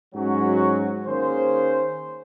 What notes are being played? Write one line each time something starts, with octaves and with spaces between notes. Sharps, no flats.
G#2 F#3 C#4 F#4
D#3 A#3 C#4 G#4 C5